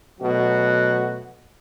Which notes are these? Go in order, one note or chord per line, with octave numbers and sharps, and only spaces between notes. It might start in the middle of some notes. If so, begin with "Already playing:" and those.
B2 F#3 A3 F#4